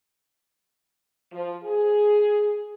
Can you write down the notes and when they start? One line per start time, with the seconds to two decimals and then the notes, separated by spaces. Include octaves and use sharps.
1.32 F3
1.64 G#4